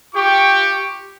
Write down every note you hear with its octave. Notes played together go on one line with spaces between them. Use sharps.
F4 G4 G5 C#6